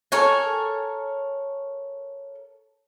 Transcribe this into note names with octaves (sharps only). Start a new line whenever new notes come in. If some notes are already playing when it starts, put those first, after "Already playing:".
A4 A#4 C#5 G#5